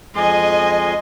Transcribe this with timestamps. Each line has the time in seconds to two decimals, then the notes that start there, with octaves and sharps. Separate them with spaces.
0.15 F2 G#3 D#5 G#5 C6